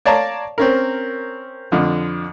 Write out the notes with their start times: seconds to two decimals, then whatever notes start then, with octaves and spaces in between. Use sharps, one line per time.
0.06 C#5 D5 F5 A5 A#5
0.58 C4 C#4 A#4
1.72 F2 D3 F3